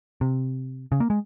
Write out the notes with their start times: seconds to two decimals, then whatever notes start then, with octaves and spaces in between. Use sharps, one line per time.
0.21 C3
0.92 C#3
1.00 A#3
1.10 G#3